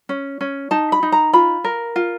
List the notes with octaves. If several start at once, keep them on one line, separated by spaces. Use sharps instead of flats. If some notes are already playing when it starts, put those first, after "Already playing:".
C#4
C#4
D#4 A5
B5
D#4
A#5
F4 B5
A#4
F4